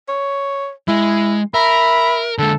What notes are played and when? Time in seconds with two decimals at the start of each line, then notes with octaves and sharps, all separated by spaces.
0.08 C#5
0.88 G#3 E4
1.54 A#4 E5 B5
2.39 D3 G#3 A4